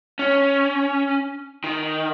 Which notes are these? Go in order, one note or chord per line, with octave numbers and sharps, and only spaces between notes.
C#4
D#3